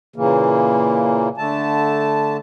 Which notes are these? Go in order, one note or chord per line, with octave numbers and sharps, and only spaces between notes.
A#2 C#3 E3 A#3
D3 A3 A5